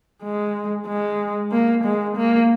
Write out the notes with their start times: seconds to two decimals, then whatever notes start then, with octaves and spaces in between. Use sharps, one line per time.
0.23 G#3
0.87 G#3
1.52 A#3
1.85 G#3
2.17 A#3